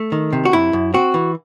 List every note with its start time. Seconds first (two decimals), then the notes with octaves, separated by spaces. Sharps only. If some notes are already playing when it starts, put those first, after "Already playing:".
Already playing: A3
0.12 D#3
0.33 C3
0.45 F#4
0.53 F#2 E4
0.73 F#2
0.94 C4 F#4
1.14 E3